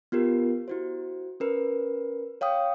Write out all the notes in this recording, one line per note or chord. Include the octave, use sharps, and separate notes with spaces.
B3 F4 G4 A#4
E4 F#4 C5
C#4 A#4 B4
C#5 F5 G5 D#6